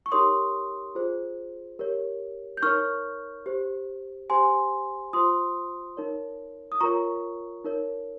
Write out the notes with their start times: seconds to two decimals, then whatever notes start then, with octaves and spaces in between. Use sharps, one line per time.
0.06 C#6
0.12 D#4 G4 A#4 C#5 C6 D#6
0.95 F4 G#4 C5
1.79 G4 A#4 C#5
2.57 G6
2.62 D#4 A#4 C#5 C#6 F6
3.46 G4 C5
4.30 G4 C5 G#5 C6
5.13 F4 C5 C6 D#6
5.97 D#4 A#4 C#5
6.72 D#6
6.80 F4 A#4 C#5 A#5 C#6
7.64 D#4 A#4 C#5